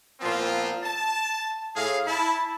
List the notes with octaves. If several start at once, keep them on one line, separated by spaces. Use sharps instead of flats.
A#2 F3 B3 C4 E4 F4
A5
A2 G#4 F5
E4 A5